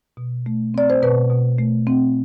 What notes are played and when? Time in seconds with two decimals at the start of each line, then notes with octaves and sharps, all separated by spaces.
0.17 B2
0.46 A3
0.74 C4 D5
0.90 C5
1.02 B2 B4
1.30 B2
1.58 A3
1.87 C4